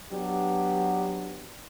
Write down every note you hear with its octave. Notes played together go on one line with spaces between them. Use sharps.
F#3 B3 D4 G4